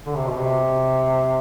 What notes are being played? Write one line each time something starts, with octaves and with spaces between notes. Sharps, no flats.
D3
C3
B2
C3